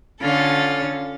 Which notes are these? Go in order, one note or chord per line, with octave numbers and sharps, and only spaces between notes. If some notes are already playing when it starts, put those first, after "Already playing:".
D3 C#4 F4 A4 A6